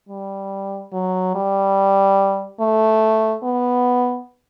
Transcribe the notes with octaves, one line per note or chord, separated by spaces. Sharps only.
G3
F#3
G3
A3
B3